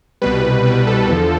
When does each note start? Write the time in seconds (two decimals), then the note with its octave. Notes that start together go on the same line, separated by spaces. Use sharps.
0.22 C2 B2 G3 B4
0.65 C2 B2 G3 B4
0.87 A4
1.08 E2 D3 F3